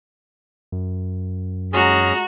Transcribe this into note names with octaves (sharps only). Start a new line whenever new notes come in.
F#2
G#3 C#4 F#4 G#4 A#5